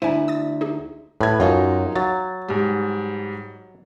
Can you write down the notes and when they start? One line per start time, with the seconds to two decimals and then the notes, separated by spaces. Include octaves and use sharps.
0.02 D2 E4 C5 G#5 A#5
0.28 D#6 A6
0.61 D#4 G4 G#4
1.21 A2 B4 G#6
1.40 F#2 F#3 D#4 F4
1.96 F#3 A6
2.48 G#2 G3